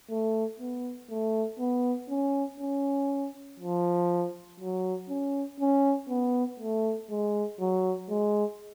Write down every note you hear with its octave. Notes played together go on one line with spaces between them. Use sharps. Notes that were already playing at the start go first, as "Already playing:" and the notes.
A3
B3
A3
B3
C#4
C#4
F3
F#3
C#4
C#4
B3
A3
G#3
F#3
G#3